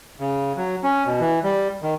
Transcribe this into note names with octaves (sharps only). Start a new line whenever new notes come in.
C#3
F#3
C#4
B2
E3
G3
D#3